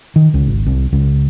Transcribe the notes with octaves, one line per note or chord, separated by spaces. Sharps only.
D#3
C#2
G#1
C2
C#2